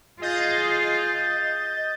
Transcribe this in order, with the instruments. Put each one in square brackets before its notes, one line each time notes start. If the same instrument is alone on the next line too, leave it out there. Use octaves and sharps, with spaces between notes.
[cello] F4 G#4 [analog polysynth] D#5 G6 A6